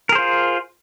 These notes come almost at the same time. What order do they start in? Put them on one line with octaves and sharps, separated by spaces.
A#4 G#4 C5 F4